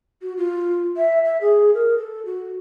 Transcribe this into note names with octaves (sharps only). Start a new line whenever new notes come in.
F#4
F4
E5
E5
G#4
A#4
A4
F#4